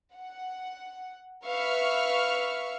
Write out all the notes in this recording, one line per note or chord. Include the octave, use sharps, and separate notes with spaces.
F#5
B4 E5 F5 C#6 F6